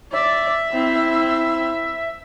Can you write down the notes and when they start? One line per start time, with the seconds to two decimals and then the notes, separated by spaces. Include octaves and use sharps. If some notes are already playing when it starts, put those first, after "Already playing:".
0.13 D5 E5
0.72 C4 E4